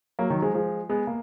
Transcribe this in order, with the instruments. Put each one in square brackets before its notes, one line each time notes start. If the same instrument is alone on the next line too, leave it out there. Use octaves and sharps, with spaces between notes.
[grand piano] F#3 A#3
D#3 F#3
F3 G#3
F3 G#3
G#3 B3
A#3